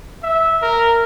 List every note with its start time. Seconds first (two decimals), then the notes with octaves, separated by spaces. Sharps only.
0.23 E5
0.62 A#4